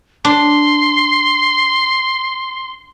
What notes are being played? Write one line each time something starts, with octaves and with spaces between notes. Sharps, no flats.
D4 C6